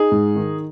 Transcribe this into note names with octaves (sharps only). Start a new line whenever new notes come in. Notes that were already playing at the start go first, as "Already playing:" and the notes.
Already playing: D#4 G#4
G#2
D#3